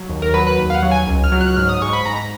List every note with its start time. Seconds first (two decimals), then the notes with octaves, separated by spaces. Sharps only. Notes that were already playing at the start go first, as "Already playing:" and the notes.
Already playing: F#3
0.09 D#2
0.22 A#4
0.34 F#3 B4
0.47 B4
0.58 D#2
0.70 F5
0.74 F#5
0.83 F#3
0.91 G#5
1.07 C#2
1.24 F6
1.32 F#3
1.41 F#6
1.56 G#2 F6
1.69 D#6
1.82 G#2 C#6
1.93 B5
2.05 G#2 A#5